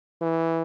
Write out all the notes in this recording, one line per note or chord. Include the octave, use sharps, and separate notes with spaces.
E3